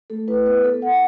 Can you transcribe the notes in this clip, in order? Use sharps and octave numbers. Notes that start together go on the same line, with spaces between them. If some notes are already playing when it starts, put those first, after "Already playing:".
A3 A4
E4 B4
B3 B4
B3 A4
E4 F#5